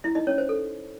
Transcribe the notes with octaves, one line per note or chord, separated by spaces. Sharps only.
E4 E5
D#4 D#5
C#4 C#5
C5
A4